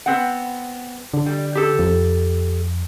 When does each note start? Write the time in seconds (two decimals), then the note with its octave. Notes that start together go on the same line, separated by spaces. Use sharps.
0.06 B3 C4 F#5
1.14 D3
1.26 G3
1.55 G4 A4
1.79 F2